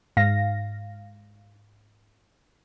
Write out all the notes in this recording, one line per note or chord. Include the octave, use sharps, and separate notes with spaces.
G#2 F5 A#6